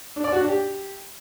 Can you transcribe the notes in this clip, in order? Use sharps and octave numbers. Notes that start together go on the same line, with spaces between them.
D4
D5
F#4
D4
G4